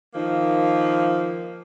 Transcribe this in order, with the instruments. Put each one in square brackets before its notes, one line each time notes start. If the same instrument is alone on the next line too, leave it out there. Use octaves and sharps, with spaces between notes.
[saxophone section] D#3 F3 A#3 D#4